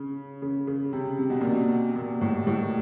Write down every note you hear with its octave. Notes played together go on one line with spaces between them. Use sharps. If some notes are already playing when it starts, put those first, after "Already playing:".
Already playing: C#3
C#3
C#3
C3
C3
B2
A#2
B2
A#2
A2
A2